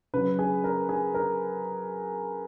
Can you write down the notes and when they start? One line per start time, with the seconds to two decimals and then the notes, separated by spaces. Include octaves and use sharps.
0.13 C#3 F#3 B4
0.39 G#4
0.64 A#4
0.89 G#4
1.14 A#4